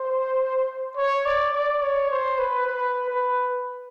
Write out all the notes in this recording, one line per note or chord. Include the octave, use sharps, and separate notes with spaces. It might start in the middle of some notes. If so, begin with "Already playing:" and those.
Already playing: C5
C#5
D5
D5
C#5
C5
B4
B4
B4